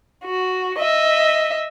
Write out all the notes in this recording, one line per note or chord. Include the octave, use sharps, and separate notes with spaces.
F#4
D#5 E5